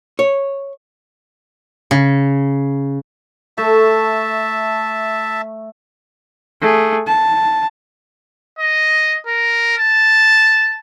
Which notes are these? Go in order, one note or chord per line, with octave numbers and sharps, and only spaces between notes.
C#5
C#3
A3 E5 A5
A3 G#4
A5
D#5
A#4
A5